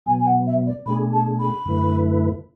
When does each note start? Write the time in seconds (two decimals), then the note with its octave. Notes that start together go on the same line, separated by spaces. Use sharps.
0.06 B2 F#3 B3 G#5
0.19 G#5
0.26 F#5
0.46 E5
0.66 D5
0.86 B2 A3 D4 G#4 B5
1.13 A5
1.39 B5
1.65 F#2 D3 A3 E4 B4